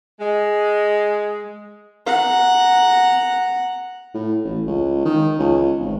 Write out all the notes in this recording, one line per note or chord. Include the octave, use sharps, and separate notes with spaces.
G#3
F#5 A#5
A2
A1
C#2
D#3
C#2
G#1